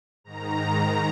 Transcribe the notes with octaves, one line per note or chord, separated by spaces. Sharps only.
G#2 D#3 A#5